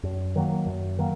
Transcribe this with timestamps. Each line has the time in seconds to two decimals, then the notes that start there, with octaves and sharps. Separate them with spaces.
0.03 F#2
0.36 D#3 F#3 A#3
0.67 F#2
0.99 D#3 F#3 A#3